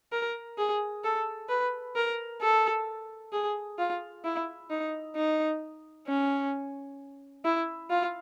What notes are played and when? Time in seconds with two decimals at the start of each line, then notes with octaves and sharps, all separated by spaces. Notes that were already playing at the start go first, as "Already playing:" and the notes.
0.12 A#4
0.58 G#4
1.04 A4
1.49 B4
1.96 A#4
2.41 A4
3.33 G#4
3.78 F4
4.24 E4
4.70 D#4
5.16 D#4
6.07 C#4
7.45 E4
7.90 F4